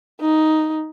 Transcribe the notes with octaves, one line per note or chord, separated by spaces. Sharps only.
D#4